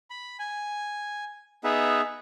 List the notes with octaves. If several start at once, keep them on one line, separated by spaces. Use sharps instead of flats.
B5
G#5
B3 D#4 G#4 B4 E5